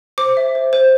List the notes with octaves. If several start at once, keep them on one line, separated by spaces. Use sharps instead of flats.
C5 D6
E5
C5
C5